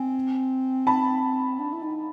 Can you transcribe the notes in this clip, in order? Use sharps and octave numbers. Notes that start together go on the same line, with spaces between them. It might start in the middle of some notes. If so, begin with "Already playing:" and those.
Already playing: C4 G#5
A5 B5
D4
E4
D#4